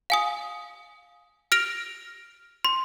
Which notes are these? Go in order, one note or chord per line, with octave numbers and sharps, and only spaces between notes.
F5 G#5 D#6
F6 A#6 D7 F7
C6